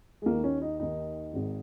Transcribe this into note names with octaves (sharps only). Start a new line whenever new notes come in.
G#3
D#2 D#3 A#3
C#4
D#4
D#2 D#3 D#4
G#1 G#2 D#3